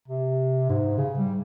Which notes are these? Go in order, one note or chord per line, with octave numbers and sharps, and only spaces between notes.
C3
G#2
C#3
G3